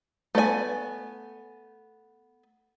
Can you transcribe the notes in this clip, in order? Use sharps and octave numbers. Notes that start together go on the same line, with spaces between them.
A3 B3 D5 G#5